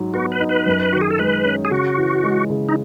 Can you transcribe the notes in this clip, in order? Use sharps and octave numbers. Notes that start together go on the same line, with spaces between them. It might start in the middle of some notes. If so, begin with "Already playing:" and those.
Already playing: G#2 F#3
B3 F#4
B4
D#4
B4
F#2
D#3 F#4
G#4
A4
G#3 B4
C#4
G#4
C#3 F#4
E3
G#3
C#3
D#4